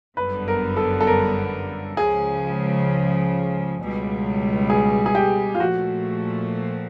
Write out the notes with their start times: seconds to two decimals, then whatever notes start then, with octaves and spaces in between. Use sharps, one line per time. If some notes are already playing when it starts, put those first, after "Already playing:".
0.17 G1 F#2 D3 G3 B3 B4
0.48 A#4
0.77 A4
1.01 A4
1.07 A#4
1.97 C#2 C#3 F3 G#4
3.79 C#2 B2 G3
4.70 G#4
5.06 G#4
5.15 G4
5.55 F4
5.59 A#2 F3 A3 F#4